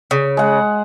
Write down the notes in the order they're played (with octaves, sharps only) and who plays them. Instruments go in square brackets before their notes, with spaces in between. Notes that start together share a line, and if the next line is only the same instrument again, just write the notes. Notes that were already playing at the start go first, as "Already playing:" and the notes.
[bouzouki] C#3
[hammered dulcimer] G#3 F#5